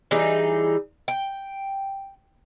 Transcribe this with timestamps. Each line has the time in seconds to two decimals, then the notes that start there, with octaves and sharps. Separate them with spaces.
0.11 E3 G3 D#4 G#4
1.08 G5